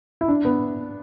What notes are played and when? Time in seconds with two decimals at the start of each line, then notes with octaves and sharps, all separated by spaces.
0.21 E4
0.28 D4
0.45 B3